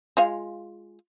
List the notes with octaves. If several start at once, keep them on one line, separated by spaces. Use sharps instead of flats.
G#3 F4 F5